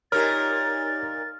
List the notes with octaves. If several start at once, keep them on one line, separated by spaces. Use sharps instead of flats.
A#2 D#4 G4 A#4 C#5 F6 A6